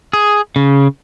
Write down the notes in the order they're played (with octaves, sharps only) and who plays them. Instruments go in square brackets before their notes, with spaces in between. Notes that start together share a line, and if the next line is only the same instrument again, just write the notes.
[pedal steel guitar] G#4
C#3